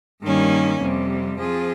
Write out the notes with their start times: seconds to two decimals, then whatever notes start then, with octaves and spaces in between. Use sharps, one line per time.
0.23 G2 D#3 G3 A#3 C#4
0.81 F2 C3 G3
1.40 F3 C4 F4 G#4